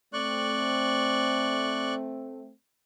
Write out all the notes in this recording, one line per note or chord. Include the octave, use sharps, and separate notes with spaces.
A3 C4 D5 C#6 F#6